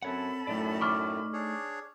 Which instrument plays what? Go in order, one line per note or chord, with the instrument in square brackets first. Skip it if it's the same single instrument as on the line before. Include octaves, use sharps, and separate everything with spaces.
[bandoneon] F#2 [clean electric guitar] C4 C#5 F#5 [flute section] A4 A5 B5
[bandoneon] F#2 A2 [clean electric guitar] A3 D#4 D5
[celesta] C#6 D6 F6
[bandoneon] D4 G#4 C#5